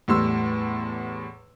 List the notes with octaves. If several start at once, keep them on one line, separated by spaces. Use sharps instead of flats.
E2 A2 G3 C6 E6